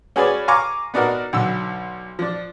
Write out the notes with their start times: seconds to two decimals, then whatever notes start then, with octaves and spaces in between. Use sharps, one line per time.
0.16 C#4 F#4 G#4 B4 C#5 D5
0.48 F5 G#5 A#5 C#6 D6
0.94 B3 D4 D#4 F#4 A#4
1.33 B1 D3 E6
2.19 F3 D4